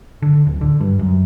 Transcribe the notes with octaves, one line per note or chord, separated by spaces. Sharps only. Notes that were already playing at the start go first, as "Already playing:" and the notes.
D3
D1
D3
G2
F#2